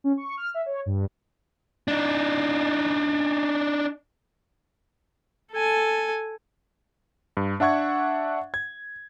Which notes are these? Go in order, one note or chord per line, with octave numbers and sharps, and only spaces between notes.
C#4
C#6
F6
E5
C#5
G2
D4 D#4
A4 G#5
G2
D4 E5 F#5 C#6 G#6
G#6